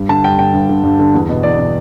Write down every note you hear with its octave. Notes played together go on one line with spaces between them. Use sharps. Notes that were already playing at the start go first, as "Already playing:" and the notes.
Already playing: G2
D3 A5
G2 G5
D3 G5
G2
D3
G2
D3
E2
B2
E2 D5
B2